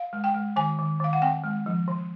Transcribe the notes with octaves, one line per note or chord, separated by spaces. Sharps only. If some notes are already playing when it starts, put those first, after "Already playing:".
Already playing: F5
G#3
G5
G#3
D#3 G#5
D#3
D#3 F5
F#5
C4 G5
G#3
F3
E3